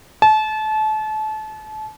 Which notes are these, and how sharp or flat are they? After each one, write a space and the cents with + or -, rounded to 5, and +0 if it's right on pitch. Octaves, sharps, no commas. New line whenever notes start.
A5 -30